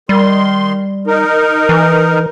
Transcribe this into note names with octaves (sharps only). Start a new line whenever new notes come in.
D#3 G3 C6
D#4 A#4
E3